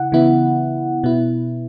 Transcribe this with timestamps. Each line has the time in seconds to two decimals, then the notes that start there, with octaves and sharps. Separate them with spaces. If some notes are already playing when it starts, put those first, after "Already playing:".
Already playing: C#3 E4 F#5
0.12 C#3 E3 B3 E4
1.03 B2 B3 E4